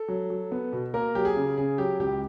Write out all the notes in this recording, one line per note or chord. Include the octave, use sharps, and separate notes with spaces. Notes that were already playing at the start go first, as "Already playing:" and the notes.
Already playing: A4
F#3
F#3
B3
B2
A#3 A#4
F#3 G4
G#4
C#3
C#3 G#4
F#3 G4
C#2 G4